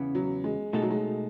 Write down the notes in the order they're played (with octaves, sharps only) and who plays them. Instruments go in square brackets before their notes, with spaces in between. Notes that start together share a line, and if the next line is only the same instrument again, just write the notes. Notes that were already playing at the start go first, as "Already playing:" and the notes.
Already playing: [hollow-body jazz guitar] E2 C#3 E3 B3
[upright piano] F#3
G#3
[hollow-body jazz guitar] B2 A3 D#4 F#4 A4 [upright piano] G#3
[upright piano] F#3
G#3